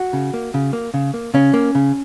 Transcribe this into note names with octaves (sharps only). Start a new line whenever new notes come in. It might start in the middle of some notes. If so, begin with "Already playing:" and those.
Already playing: F#4
C#3
A#3
C#3
A#3
C#3
A#3
C#3 C#4
A#3
C#3